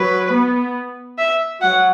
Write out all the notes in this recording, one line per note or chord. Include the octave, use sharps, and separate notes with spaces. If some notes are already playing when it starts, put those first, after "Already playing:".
Already playing: F#3 B4
B3
E5
F#3 F#5